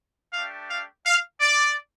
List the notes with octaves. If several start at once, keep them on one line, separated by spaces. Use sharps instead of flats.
A3 D4 G4 F5
F5
F5
D5